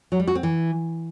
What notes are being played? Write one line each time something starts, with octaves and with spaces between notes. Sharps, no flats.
F#3
G3
F#4
C4
E3